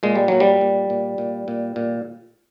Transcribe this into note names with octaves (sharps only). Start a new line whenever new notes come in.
A#2 G#3
G3
A#2 F#3
G3
A#2
A#2
A#2
A#2
A#2